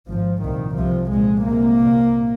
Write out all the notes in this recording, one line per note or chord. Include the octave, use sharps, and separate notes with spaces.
G#1 G#2 F3
C2 A#2 D#3
C2 C3 F3
C2 A#2 G#3
C2 C3 A#3
C2 A#2